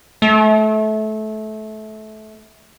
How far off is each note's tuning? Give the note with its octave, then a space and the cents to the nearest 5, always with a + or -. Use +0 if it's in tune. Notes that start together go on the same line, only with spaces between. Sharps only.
A3 -25